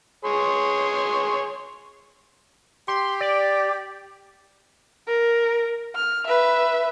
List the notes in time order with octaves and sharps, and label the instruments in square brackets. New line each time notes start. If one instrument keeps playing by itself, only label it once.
[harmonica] G#4 C#5 C6
[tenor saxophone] G4 [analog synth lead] C6
[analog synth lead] D5
[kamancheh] A#4
F6
B4 E5